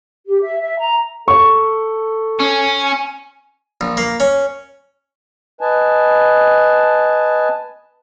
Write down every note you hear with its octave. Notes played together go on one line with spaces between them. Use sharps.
G4
E5
E5
A#5
A4 C#6
C#4 G#5
A#1
A#3
C#4
B4 D#5 G#5 A5